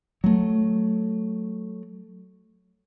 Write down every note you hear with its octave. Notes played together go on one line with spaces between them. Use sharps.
F#3 A3